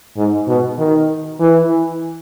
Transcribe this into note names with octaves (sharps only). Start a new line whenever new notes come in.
G#2
B2
D#3
E3